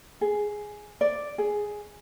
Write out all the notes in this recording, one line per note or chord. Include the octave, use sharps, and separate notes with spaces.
G#4
D5
G#4